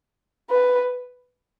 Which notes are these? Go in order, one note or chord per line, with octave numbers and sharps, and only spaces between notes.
B4